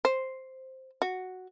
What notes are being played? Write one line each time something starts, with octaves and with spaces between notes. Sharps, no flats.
C5
F#4